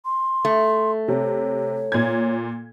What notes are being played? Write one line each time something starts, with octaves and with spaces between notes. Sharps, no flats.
C6
A3
C3 C#5
A#2 G#6